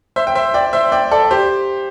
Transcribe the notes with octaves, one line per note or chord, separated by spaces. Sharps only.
C5 E5
G5
C5 E5
D5 G5
C5 E5
D5 G5
A4 D5
G4 C5